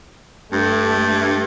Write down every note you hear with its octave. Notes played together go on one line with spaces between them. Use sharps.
G2 A3